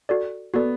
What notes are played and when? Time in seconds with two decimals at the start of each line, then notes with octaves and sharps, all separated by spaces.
0.09 F#4 A4 D5
0.54 B3 F#4 A4 D5